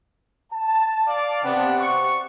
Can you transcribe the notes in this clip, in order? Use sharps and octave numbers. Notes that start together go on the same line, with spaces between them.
A5
D5 F5
C3 B3 C4 D4 F#5
C#6